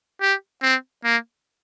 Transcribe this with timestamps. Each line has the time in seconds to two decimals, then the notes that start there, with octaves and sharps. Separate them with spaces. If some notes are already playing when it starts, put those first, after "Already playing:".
0.21 G4
0.62 C4
1.04 A#3